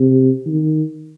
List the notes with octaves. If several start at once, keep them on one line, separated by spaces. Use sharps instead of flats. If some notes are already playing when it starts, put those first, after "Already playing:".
Already playing: C3
D#3